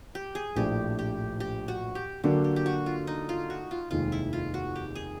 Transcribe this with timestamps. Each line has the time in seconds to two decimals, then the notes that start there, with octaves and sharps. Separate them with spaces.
0.15 G4
0.35 G#4
0.56 A#1 A2 F3 A3 D4 G4
0.99 G4
1.40 G4
1.68 F#4
1.95 G4
2.24 D3 F#3 A#3 D4 G4
2.44 G4
2.56 G4
2.66 F#4
2.86 F4
3.07 D#4
3.29 F4
3.50 F#4
3.71 F4
3.91 F1 D#2 D#3 G#3 F4
4.12 E4
4.33 F4
4.54 F#4
4.76 G4
4.95 G#4